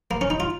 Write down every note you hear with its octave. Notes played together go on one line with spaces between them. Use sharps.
A#3
C#4
D#4
F4